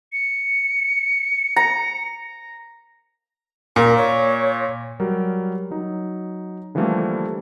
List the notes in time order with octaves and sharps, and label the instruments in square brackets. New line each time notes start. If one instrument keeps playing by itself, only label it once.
[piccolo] C#7
[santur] A#5
[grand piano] A#2 [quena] A#4
[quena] C#5
[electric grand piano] F#3 G3 A#4
F#3 D#4
D3 E3 F3 G3 A3 A#3